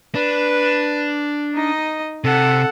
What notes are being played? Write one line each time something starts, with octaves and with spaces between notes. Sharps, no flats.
D4 B4
D#4 D#5
C3 A4 F#5